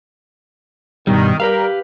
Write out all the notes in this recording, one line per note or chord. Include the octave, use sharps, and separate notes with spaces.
G2 B2 D#3 G3
G3 G4 A#4 B4 F5